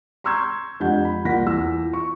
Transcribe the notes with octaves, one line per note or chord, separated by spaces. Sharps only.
A#5 C6 C#6 E6 G6 G#6
F2 G#3 D4 G4 F#5 G6
B5
C2 A#3 F4 F#5 A#6 B6
E2 F4 E6
C#6